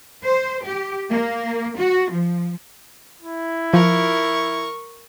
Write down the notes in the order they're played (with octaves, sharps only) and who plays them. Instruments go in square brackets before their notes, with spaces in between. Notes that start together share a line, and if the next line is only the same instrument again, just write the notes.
[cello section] C5
G4
A#3
F#4
F3
[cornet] E4
[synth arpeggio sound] F3 [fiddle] A#4 C#6